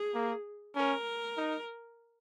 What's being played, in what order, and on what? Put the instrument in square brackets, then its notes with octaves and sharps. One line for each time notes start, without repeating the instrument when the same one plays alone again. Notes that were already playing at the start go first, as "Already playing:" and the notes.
Already playing: [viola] G#4
[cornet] A#3
[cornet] C#4 [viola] A#4
[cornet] D#4